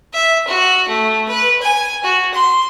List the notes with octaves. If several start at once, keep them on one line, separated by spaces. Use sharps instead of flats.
E5
F#4
A3
B4
G#5
F#4
C6